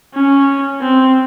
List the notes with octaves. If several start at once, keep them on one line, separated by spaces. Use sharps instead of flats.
C#4
C4